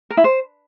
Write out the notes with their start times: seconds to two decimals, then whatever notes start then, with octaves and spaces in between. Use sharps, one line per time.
0.10 A#4
0.17 E4
0.24 C5